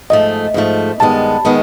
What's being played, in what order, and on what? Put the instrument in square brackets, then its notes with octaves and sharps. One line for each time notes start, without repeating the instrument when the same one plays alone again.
[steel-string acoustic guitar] G#2 F3 A3 [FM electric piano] D#5
[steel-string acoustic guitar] G#2 F3 A3
[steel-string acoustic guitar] G2 D#3 G#3 B3 [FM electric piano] A5
[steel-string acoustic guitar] D#3 G#3 B3